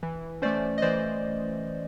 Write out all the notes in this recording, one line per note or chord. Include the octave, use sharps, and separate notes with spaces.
E3
A3 C#4 C5 D5
D#5
E3 C5 D5